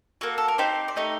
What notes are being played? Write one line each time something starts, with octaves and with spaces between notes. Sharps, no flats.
A#3 F#4 A4
A4
A#4
C4 D#4 G4 C5
D5
A3 D#4 G4 D#5